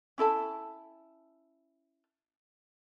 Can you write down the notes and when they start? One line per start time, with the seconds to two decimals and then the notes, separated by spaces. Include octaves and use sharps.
0.18 C#4 E4 A4 A5